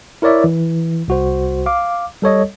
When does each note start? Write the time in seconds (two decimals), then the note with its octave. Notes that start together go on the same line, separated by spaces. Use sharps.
0.22 E4 A#4 C#5 D5 E5
0.44 E3
1.08 C2 F#4 C5
1.66 F5 D6
2.22 G3 A4 C#5 D#5